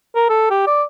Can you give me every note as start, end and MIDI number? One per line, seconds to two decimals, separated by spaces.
0.16 0.25 70
0.29 0.48 69
0.50 0.64 67
0.67 0.83 74